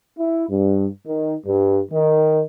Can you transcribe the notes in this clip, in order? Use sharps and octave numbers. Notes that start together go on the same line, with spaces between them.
E4
G2
D#3
G2
D#3